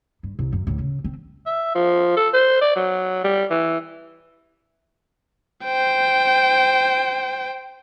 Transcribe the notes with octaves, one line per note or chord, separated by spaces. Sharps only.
G2
C2 C3
F#2
D2 A2
C#3
C4
E5
F3
A4
C5
D5
F#3
G3
E3
C5 G5